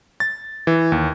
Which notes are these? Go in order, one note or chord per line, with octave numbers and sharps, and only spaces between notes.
A6
E3
D#2